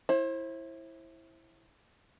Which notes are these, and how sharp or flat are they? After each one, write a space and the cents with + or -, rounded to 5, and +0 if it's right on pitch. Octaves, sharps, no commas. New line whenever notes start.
E4 +0 C5 +30